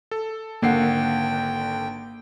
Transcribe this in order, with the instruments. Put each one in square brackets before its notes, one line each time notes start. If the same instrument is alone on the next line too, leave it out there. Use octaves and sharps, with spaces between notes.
[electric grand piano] A4
[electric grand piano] G#1 D3 C7 [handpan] A#3 F#5 [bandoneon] G5